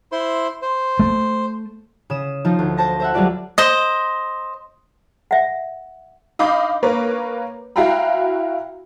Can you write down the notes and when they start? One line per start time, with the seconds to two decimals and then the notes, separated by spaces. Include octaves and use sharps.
0.12 E4 C5 C6
0.62 C5
0.99 A3
2.10 C#3 D#6 E7
2.45 F3 D#4 F4
2.59 D2
2.77 C5 A5 A#6
3.00 C5 E5 F#5
3.14 F#3 G3 D4 F4 D5 E5
3.58 C5 D#5
5.31 E5 F#5
6.39 D#5 F5 B5 D6 G6
6.83 A#3 A#4 B4 C#5
7.76 E4 F#4 F5 G5 A#5 B5